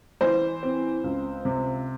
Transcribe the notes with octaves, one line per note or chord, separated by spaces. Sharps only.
E3 C5
C4
C#2
C3